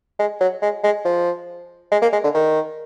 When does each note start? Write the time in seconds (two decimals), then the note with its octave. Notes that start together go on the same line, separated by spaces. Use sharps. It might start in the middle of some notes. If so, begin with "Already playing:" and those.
0.19 G#3
0.40 F#3
0.62 G#3
0.84 G#3
1.05 F3
1.92 G#3
2.02 A#3
2.12 G#3
2.24 D3
2.34 D#3